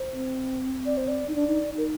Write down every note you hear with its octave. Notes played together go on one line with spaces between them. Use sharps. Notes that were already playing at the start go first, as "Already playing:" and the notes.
Already playing: C5
C4
D5
C5
D5
D#4
D4 D5
D#4
D#4
A#4